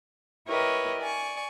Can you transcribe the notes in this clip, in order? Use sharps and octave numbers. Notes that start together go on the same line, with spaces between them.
E4 G4 A#4 B4 C#5 D#5
D5 G#5 C#6